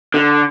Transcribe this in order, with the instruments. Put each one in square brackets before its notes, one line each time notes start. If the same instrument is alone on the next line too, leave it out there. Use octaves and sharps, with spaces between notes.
[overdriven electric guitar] D3